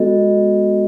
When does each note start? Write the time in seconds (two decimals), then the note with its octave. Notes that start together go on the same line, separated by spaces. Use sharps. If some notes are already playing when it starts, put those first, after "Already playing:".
Already playing: G#3 B3 F#4 A4 D#5